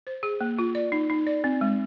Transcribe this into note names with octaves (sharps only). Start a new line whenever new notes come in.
C5
G#4
A#3
F4
D5
D#4
D#4
D5
C4
G#3